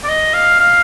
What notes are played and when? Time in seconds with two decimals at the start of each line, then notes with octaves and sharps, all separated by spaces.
0.04 D5
0.09 D#5
0.34 F5
0.60 F5